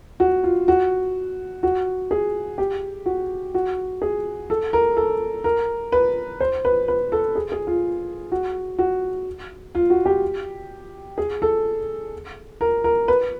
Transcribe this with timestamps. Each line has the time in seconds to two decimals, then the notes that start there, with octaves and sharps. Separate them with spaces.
0.20 F#4
0.44 F4
0.68 F#4
1.63 F#4
2.11 G#4
2.58 G4
3.06 F#4
3.54 F#4
4.02 G#4
4.50 A4
4.73 A#4
4.97 A4
5.44 A#4
5.92 B4
6.40 C5
6.65 B4
6.88 B4
7.12 A4
7.35 G#4
7.52 G#4
7.67 F4
8.32 F#4
8.79 F#4
9.75 F4
9.90 F#4
10.06 G4
11.18 G#4
11.42 A4
12.61 A#4
12.84 A#4
13.08 B4